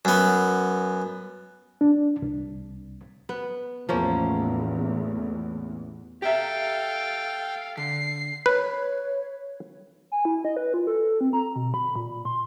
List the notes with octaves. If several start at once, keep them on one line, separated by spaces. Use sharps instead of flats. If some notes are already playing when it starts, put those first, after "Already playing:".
F#2 B3
D4
C2
B3
A1 E2 F3 A#3 C#4
G4 A4 E5 F5 G5
D3 C7
B4 C#5
G#5
E4
D#5
B4
F4
A4
C4
A#5
B2
B5
A#2
C6